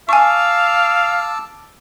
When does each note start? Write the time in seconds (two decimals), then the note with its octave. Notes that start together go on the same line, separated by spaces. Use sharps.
0.09 F5 G#5 A5 C#6 D6 E6